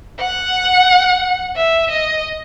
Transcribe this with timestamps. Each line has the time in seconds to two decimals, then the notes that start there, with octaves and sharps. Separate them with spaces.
0.19 F#5
1.56 E5
1.91 D#5